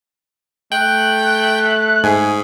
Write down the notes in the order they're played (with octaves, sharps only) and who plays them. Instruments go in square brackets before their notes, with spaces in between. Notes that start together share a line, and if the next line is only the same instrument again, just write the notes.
[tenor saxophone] A3 [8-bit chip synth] G5 [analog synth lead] F#6
[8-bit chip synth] G#2 [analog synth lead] G#4